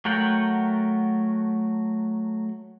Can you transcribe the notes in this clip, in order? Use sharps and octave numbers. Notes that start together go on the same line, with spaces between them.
F#3 A3 A#4 F#5 G5